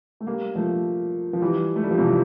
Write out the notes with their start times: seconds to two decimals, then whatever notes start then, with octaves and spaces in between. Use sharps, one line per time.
0.20 A3
0.27 G3 A#3
0.55 F3 A3
1.33 F3
1.42 E3 G3
1.76 A3
1.84 G3
1.91 F3
1.98 C3 E3